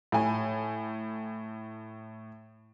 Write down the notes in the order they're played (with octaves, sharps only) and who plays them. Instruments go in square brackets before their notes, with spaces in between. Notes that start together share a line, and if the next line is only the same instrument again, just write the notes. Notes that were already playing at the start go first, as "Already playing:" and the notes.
[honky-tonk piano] A2 G#5